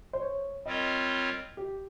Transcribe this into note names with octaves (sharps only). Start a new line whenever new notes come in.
C5
C#5
G3 C4 F4 A#4 C#5 D#5
G4